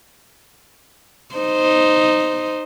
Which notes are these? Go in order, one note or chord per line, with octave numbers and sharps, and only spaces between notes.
D#4 C5